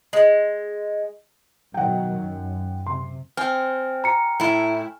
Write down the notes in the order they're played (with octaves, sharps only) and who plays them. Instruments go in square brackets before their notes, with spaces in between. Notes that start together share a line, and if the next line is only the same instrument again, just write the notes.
[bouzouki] G#3
[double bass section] B2 D#3 F#3 [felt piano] F#5 G5
[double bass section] F#2
[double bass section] C3 [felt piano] C6
[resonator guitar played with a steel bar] C4 [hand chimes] G5 G#5 F6
[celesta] A#5 C#7
[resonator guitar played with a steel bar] A2 E4